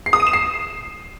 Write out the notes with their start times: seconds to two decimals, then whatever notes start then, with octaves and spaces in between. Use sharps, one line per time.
0.06 C7
0.13 D#6
0.20 D#7
0.27 E7
0.33 C7